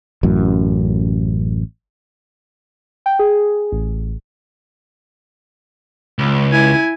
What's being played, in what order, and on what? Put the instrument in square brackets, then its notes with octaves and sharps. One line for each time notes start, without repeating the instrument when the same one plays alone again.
[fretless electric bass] A1 F#2
[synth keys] G5
G#4
A1
[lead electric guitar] C#2
[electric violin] E4 G#5